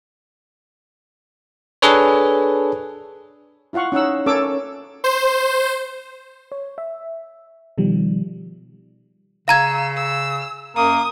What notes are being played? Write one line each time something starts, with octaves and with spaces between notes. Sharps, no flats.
D4 G#4 A4 B4 C#5
E4 F4 F5 F#5 C#6
C#4 D#4 F#5 E6
C#4 A4 A#4 C#5 D6 E6
C5
C#5
E5
B2 D#3 F3 G3
C#3 F5 A#5 E6 G#6
E6
F#2 A#3 D#6